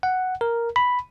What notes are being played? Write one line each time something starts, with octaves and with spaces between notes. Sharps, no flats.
F#5
A#4
B5